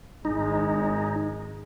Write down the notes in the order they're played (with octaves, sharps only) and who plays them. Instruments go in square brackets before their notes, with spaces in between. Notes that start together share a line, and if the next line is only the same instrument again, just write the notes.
[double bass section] G#1 G#3 [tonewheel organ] D#4